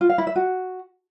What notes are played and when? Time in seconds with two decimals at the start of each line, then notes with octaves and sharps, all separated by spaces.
0.01 F4
0.09 F5
0.18 E4
0.27 E5
0.36 F#4